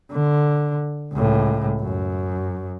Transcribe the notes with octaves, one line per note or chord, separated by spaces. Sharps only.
D3
C#2 A2
F#2